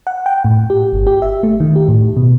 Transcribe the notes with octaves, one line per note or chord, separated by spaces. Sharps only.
F#5
G5
A2
G4
G1
G4
E5
A3
D#3
G4
A2
B2